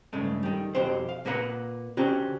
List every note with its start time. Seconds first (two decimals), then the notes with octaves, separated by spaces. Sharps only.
0.13 G2 C#3 G#3 A3
0.43 D#3 G3
0.75 B1 F2 F#4 G4 C5
1.09 F5
1.25 A#2 A#3 B4 F#5 A#5
1.97 D3 C#4 F#4 G4 C5 A#5